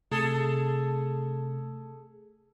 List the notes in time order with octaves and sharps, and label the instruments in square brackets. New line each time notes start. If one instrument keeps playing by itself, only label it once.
[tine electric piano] C3 A3 [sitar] G#4 A4